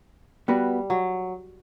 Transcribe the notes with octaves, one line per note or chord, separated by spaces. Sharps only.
G3 B3 F#4 B4
F#3